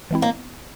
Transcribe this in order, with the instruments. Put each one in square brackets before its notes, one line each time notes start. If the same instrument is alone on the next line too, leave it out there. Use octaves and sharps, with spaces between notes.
[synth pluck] E3 G#3 C4 E4
[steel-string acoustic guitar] A#3